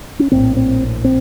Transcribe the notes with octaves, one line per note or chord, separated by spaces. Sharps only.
C#4
A#1 A2 C4
C4
C4